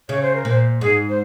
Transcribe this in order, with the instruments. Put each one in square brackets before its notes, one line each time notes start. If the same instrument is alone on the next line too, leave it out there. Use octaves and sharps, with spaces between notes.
[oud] C#3 [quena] C#5
[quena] C5
A#4
[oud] A#2 [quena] C5
[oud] G#2 [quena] G#4
[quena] C5